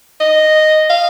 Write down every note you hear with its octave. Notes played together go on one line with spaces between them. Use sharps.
D#5
F5